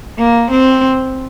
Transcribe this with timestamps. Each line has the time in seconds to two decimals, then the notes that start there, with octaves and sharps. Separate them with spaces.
0.18 A#3
0.51 C4